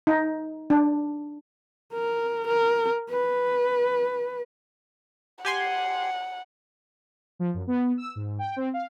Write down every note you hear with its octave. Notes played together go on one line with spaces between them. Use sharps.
D#4
D4
A#4
A#4
B4
G4 F#5 G#5 C6
F3
F#2
B3
E6
G#2
G5
C4
F5